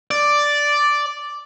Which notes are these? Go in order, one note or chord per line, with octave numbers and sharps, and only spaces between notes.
D5